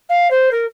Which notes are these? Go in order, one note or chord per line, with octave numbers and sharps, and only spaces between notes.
F5
C5
A#4